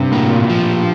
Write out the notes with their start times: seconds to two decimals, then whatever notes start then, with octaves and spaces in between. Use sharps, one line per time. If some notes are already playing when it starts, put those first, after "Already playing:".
Already playing: G2 C3
0.11 A2 A#3
0.30 A#2
0.49 F3